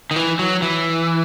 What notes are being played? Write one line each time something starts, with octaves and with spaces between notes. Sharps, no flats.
D#3
E3
F#3
E3